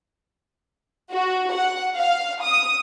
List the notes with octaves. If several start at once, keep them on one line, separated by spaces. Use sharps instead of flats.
F#4
F#5
F5
D#6